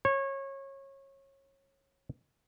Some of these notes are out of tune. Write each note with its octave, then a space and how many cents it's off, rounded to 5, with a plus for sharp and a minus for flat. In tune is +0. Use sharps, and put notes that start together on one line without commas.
C#5 -25